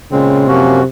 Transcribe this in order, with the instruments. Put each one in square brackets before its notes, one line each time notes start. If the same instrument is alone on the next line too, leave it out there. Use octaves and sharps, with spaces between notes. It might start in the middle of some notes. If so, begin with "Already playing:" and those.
[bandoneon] A#2 G#3 C4 [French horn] C#3
[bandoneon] F#2 F3 A#3 C#4 F#4 [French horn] C3